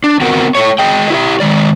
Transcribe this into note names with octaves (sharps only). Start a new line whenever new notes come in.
D4
B3 C4 F#4 A#4
A3 C#5
G#4 D#5 G5
E4 G4 E5
D#3 G#3 D5